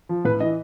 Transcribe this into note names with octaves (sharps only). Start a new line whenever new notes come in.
F3
A2 B4
E3 D#5